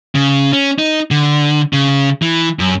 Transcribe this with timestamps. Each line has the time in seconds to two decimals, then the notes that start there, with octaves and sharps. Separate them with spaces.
0.15 C#3
0.53 C#4
0.79 D#4
1.11 D3
1.73 C#3
2.22 E3
2.59 F#2